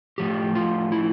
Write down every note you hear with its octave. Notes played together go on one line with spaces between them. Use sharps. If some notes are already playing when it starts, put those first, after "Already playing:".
A2 F3 A3 G4
F4
E4